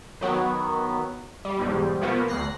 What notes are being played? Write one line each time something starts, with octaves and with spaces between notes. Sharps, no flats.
D#3 F#3 B3
G3
B1 E2 G#2 G3
B2 F3 A#3 B3
D2 F#6 A#6 C7